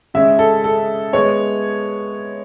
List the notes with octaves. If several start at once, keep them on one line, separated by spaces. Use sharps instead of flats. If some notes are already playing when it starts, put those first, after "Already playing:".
C#3 G#3 C#4 E5
A4
A4
G#3 B3 C#5